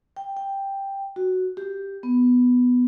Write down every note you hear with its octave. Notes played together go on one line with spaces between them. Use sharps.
G5
G5
F#4
G4
B3